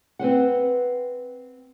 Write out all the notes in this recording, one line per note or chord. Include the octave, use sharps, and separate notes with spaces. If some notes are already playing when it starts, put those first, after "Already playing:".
C4 B4 C5 F#5